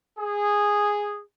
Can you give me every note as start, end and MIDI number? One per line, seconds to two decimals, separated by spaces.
0.17 1.21 68